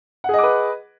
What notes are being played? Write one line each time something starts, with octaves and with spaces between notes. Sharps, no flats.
G#4 B4 D#5 F#5 D6